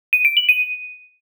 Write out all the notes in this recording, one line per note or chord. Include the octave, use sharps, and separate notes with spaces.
D#7
D7
F#7
D#7